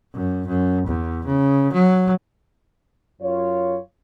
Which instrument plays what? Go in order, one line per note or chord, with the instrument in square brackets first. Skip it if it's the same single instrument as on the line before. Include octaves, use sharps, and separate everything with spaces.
[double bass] F#2
F#2
E2
C#3
F#3
[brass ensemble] F#2 F4 C#5